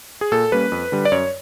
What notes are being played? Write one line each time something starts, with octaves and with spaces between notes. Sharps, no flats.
G#4
A#2 A4
G3 A#3 C#4 B4
F2
D3 G3
D5
F#2 C#5